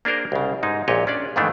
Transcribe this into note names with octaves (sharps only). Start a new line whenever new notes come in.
A#3 D4 G#4 A#4 C5
C2 C#3
G#2 G#3 D#4
A#1 A#2 G4 C#5 D#5
C#4 D4 D5
F2 G#2 D#3 E3 A3 D4